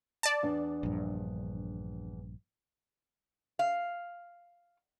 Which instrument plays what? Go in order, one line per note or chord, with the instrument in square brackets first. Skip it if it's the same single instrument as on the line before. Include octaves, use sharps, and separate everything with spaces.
[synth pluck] D5 A5
[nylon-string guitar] E2 D4
[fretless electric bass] A#1 G2
[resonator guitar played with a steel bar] F5